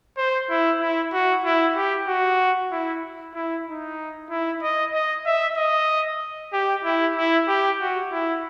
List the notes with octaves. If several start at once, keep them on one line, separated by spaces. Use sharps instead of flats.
C5
E4
E4
F#4
E4
G4
F#4
E4
E4
D#4
E4
D#5
D#5
E5
D#5
G4
E4
E4
G4
F#4
E4